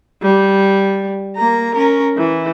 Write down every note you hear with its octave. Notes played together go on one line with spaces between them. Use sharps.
G3
A#3 A#5
C#4 A#4
E3